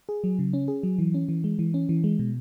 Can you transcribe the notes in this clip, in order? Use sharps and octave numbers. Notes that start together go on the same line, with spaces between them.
G#4
F#3
C#3
C#4
G#4
F#3
E3
C#4
E3
G#3
E3
C#4
E3
G#3
B2